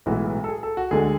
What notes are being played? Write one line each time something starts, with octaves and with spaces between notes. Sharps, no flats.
B1 A2 E3 G#3 B3 F#4
A4
G#4
A4
F#4
D2 D3 G#3 G#4